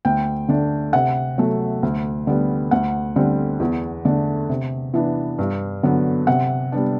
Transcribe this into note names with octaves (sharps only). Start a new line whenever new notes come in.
D2 G5
D3 A3 D4
C3 F#5
F#3 A3
D2
D3 G3 B3
D2 F#5
D3 G3 C4
E2
D3 A3 D4
C3
E3 B3 D4
G2
D3 F#3 B3
C3 F#5
G3 B3 D4